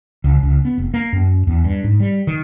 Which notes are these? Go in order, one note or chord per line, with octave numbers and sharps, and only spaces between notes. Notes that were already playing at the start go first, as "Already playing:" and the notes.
C#2
C#2
B3
F1
A#3
F#2
E2
G2
G#2
G3
D#3